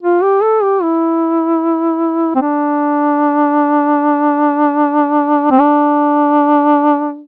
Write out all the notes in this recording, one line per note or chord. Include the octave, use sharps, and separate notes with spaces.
F4
G4
A4
G4
E4
C4
D4
C4
D4